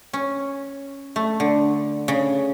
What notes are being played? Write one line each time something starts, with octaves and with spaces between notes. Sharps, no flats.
C#4
A3
D3
C#3